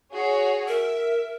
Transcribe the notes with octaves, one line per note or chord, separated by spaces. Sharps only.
F#4 G#4 C#5
A#4 E5